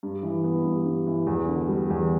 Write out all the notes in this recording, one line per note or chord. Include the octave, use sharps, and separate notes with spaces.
G2
E3
B3
G2
G2
E3
E2
D3
G3
E2